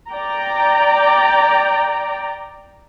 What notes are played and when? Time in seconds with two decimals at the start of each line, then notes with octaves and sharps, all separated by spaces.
0.11 D5 G5 A#5